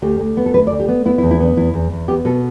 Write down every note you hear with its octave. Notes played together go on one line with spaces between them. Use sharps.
D2 G4
D2
B3
A4
D2 B4
D5
D2
G4
B3
B3 E4
E4
E2
E4
B3 D4
E2 E4
E2
E2
B3 G4
B2 A4